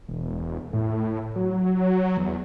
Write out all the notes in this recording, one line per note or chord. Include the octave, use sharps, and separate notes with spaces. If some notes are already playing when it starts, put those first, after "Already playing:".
E1
A2
F#3
E2